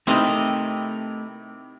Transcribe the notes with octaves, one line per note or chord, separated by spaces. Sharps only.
C3 D#3 A3 C4 E4 A#4 B4 D#5